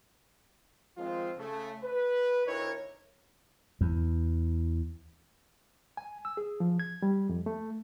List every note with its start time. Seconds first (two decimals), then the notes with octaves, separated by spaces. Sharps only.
0.98 D#3 F3 G#3 C4 F4
1.38 C#3 A3
1.83 B4
2.47 D2 D#4 E4 A#4 C#5
3.81 E2
5.97 G#5
6.25 E6
6.37 G#4
6.60 F3
6.80 G#6
7.02 G3
7.29 F2
7.46 A3